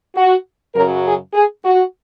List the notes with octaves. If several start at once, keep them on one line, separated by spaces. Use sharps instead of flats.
F#4
F#2 C#3 F#3 A#4
G#4
G#4
F#4